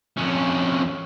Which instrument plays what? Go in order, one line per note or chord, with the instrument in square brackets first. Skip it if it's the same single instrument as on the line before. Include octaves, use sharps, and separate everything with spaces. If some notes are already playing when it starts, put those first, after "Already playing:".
[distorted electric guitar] F2 C#4